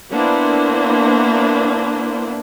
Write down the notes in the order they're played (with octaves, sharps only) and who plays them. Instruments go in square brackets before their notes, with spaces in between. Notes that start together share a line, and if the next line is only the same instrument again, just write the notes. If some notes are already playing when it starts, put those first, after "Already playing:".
[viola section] A#3 B3 D4 E4 C5